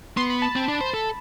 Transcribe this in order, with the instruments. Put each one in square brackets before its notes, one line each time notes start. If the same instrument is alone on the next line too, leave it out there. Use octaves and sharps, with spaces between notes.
[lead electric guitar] B3 [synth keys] C6
[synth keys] B5
A5
[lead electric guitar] C4
D4
C5
A4